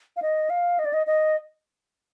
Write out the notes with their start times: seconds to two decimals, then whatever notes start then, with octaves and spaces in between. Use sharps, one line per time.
0.16 F5
0.22 D#5
0.50 F5
0.79 D#5
0.85 D5
0.93 D#5
1.07 D#5